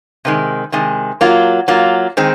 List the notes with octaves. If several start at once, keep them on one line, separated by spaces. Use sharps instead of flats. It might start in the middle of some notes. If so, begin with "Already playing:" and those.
C3 D#3 G#3
C3 D#3 G#3
F#3 A#3 F4
F#3 A#3 F4
D#3 G#3 C4